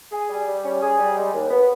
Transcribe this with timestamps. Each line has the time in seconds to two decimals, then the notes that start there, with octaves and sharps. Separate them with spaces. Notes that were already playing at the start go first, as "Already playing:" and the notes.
0.12 G#4
0.29 G3
0.46 G3
0.64 C#4
0.81 G#4
0.99 G3
1.16 G#3
1.34 D#2
1.50 B3